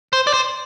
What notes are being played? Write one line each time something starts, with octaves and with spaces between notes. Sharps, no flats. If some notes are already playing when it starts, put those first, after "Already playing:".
C5
D5
C5